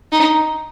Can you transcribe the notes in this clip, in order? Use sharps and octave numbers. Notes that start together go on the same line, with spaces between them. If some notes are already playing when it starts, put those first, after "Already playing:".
D#4